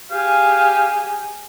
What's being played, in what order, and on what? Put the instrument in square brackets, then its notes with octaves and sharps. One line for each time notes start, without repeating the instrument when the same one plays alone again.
[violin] G4 G#4 [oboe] F5